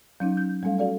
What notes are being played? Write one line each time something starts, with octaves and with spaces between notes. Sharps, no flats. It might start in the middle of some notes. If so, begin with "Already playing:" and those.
F#3 C#4 D#4
G6
G3 A3 C#4 A4 F5
F#4 A4 D5 F5